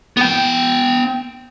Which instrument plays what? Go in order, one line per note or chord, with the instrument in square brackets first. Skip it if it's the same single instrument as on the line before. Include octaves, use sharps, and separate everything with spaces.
[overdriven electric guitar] B3 G5